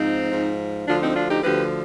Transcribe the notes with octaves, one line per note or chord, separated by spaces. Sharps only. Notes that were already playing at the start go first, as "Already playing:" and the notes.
Already playing: G#2 F3 C4 D#4
G#2 F3
D2 D3 F3 D4 F4
C4 D#4
D4 F4
D#4 G4
D2 D3 F3 G4 B4